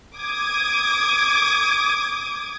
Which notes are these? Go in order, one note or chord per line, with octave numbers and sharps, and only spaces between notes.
D6 D#6 G#6